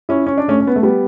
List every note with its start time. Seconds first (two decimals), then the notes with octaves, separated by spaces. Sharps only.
0.09 C#4 E4
0.27 C#4
0.38 D4
0.48 A3 C#4
0.61 C#4
0.67 B3
0.76 A3
0.83 G3 B3